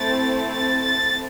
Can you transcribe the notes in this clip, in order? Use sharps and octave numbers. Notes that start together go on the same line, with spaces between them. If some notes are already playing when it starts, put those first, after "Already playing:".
Already playing: A3 C4 E4 A6
A6
A6